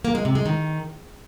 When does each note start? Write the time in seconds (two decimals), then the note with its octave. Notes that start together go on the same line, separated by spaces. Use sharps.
0.05 A#3
0.15 G#3
0.25 C3
0.35 G#3
0.46 D#3